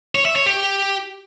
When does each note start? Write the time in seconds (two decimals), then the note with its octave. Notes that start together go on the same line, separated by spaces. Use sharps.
0.15 C#5
0.25 E5
0.36 C#5
0.46 G4